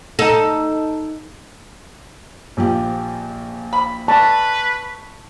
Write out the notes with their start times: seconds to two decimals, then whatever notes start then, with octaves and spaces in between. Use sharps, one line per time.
0.19 D#4 A4
2.57 A#1 F3 G4
3.73 B5
4.08 B4 A5 C#6